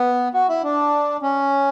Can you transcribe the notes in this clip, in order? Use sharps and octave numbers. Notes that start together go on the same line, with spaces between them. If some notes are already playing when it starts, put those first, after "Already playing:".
Already playing: B3
F#4
E4
D4
C#4